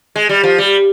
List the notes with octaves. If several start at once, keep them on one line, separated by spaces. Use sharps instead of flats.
G#3
G3
F3
G3